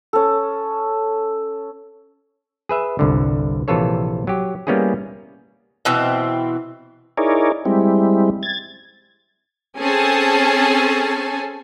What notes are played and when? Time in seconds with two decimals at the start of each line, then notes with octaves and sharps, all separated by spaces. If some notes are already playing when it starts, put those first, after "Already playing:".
0.13 C#4 A4
2.69 G#4 B4 E5
2.99 G1 C2 D3
3.68 A#1 C3 E3 F4 A4 C#5
4.27 F#3 G4
4.67 G3 A#3 B3 C#4 E4 G#4
5.85 B2 E3 C4
7.18 D#4 E4 G#4 A#4 C#5 D5
7.65 G3 G#3 C4 E4
8.43 G#6 A6
9.79 C4 C#4 G#4 A4 G#5 A5